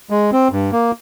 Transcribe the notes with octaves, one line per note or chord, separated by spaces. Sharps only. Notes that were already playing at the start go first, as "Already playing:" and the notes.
G#3
C4
G2
A#3